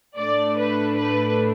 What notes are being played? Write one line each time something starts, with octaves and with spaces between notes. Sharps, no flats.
A2 A3 D4 D5
B4
B4